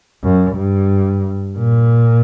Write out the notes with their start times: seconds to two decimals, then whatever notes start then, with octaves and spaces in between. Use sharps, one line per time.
0.23 F#2
0.57 G2
1.57 A#2